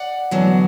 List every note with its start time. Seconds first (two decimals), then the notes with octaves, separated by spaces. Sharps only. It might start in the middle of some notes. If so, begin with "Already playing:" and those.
Already playing: D5 F#5
0.31 E2 D3 F#3